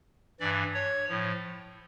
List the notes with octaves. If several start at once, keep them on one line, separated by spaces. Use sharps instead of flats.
G2 E3 D5
C#5
A2 F3